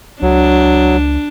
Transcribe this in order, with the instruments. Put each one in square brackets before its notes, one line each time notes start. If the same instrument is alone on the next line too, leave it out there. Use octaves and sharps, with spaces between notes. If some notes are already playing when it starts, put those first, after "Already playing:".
[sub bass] C#2 [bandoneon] F#3 [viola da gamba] D4